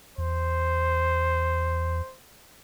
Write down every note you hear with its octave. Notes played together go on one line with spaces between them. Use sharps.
E2 C5